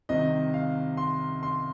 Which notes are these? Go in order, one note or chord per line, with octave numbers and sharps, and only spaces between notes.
C2 C3 D#3 D#5
F5
C6
C6